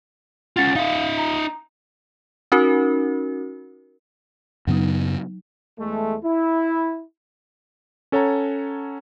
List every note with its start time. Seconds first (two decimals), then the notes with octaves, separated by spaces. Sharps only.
0.57 C#4 F4 F#5 A6
0.75 D#4 E5 F5
1.18 A#5
2.52 C#4 D#4 F#4 A#4
4.67 F#2 C#3 F#3 B3 D#4
5.78 E2 G#3 A3
6.23 E4
8.12 C#4 A4 C#5 F#5 A5 A#5